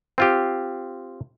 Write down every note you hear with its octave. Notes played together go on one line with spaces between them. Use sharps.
C4 F4 G4